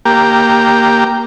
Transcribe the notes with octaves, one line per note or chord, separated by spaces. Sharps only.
A#3 G4